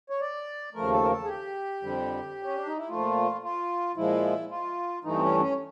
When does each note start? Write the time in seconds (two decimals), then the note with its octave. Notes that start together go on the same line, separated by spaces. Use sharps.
0.10 C#5
0.21 D5
0.74 D#2 C#3 F3 A3 A#4
0.92 A4
1.03 A#4
1.10 A4
1.24 G#4
1.28 G4
1.82 F2 D3 G3
2.43 C#4
2.55 D4
2.66 D#4
2.77 E4
2.89 A#2 F3 A3 F4
3.44 F4
3.97 A#2 F3 G#3 E4
4.50 F4
5.04 G2 E3 A3 D#4
5.16 C4
5.22 C#4
5.40 C#4